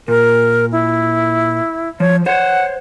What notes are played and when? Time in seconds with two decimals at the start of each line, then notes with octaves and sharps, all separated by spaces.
0.08 A#2 A#4
0.72 E4
2.00 F3 C#5
2.26 C5 C#5 F#5